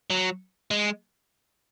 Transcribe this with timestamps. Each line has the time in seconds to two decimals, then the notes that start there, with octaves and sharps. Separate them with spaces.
0.10 F#3
0.71 G#3